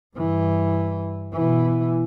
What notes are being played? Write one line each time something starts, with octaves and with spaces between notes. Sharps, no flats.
G2 E3
B2 E3